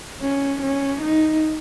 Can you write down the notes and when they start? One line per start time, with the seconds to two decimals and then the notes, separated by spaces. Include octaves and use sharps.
0.21 C#4
0.62 C#4
1.02 D#4